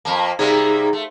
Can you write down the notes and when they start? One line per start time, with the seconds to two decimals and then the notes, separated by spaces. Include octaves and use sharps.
0.05 F2 A#3 A5
0.39 C3 G3 A#3 D#4 G#4 A#5
0.93 A3